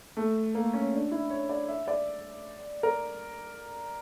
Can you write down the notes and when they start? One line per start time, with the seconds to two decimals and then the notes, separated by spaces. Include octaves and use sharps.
0.17 A3
0.55 A#3
0.73 C#4
0.93 D4
1.11 E4
1.30 C#5
1.49 D5
1.68 E5
1.88 D5
2.83 A#4